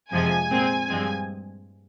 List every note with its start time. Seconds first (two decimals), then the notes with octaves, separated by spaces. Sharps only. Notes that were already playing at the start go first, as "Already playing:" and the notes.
0.12 F2 C3 F3 G#3 G#5
0.50 A#2 G#3 C4
0.88 G2 F3 G#3 C4